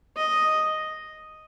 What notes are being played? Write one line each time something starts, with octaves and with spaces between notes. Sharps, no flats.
D#5